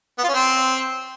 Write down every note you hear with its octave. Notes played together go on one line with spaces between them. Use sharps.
B3
F4
C#4
C4